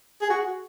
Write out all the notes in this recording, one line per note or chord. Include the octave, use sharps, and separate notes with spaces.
G#4
F#4